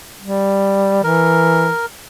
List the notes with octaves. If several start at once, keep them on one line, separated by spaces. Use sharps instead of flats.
G3
E3 A#4